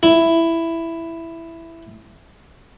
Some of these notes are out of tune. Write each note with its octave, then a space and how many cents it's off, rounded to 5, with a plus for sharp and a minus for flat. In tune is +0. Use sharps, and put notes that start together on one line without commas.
E4 +5